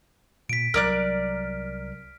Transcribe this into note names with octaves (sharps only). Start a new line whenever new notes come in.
A#2 B6 D7
C2 F#3 A#4 D5 F6 F#6